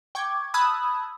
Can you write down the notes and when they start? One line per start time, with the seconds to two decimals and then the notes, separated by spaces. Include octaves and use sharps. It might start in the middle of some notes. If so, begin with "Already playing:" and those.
0.15 G5 C#6 D6 G#6
0.54 A5 B5 D#6 E6 F#6 G#6